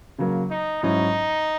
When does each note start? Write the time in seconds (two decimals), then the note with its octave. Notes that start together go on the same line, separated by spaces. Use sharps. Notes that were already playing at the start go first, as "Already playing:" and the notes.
0.19 C#3 F#3 A#3
0.50 D#4
0.83 G#2 F#3 C#4 D#4 E4